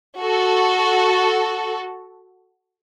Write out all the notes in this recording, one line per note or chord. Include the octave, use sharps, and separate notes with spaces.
F#4 A4